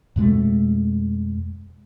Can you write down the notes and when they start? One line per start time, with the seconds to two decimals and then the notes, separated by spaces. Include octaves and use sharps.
0.16 F2 B2 G#3 A3